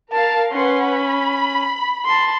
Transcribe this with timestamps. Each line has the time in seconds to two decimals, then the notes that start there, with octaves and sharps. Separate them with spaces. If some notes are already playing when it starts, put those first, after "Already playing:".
0.12 A#4 F5 A5
0.53 C#4 B4 F#5 C6
0.86 B5
2.05 A5 C6